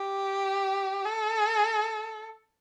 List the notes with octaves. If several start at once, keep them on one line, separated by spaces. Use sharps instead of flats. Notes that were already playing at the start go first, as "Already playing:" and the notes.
Already playing: G4
A4